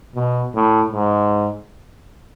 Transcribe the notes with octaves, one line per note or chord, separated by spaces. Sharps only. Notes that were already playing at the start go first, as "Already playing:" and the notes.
B2
A2
G#2